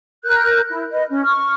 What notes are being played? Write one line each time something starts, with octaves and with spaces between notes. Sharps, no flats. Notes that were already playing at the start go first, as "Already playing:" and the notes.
A#4 F#6 G6
E4
B4 D#5
C#4
C#6 F6